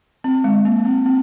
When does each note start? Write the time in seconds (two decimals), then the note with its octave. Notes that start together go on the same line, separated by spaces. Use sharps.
0.24 C4
0.44 G#3
0.65 A#3
0.85 C4
1.06 C4